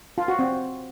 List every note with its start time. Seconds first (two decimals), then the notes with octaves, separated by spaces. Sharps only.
0.18 F4
0.28 F#4
0.39 C4